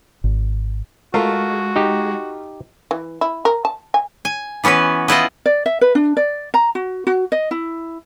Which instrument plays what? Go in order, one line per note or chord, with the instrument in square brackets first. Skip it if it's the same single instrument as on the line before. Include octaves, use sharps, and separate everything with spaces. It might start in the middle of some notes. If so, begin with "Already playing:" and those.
[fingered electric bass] G#1
[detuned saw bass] G#3 [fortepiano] A3 F4 A#4 [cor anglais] F#4
[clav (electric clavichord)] D#4 G4
[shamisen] E3
E4
A#4
A5
G#5
[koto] G#5
E3 B3 C#4 F#4 B4
B3 E4 F4 D#5
[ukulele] D5
E5
B4
D4
D5
A#5
F#4
F#4
D#5
E4